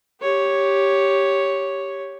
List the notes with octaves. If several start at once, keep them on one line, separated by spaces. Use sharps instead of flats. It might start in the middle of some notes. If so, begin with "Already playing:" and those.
G4 C#5